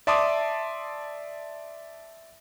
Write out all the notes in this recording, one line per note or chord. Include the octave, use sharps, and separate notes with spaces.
D5 E5 A5 C6 D6 D#6